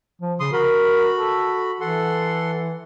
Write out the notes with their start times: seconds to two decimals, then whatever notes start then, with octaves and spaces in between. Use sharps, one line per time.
0.22 F3
0.40 C#3 C6 D#6
0.52 F#4 A#4 B5
1.13 A4
1.81 E3 A4 F#5 C6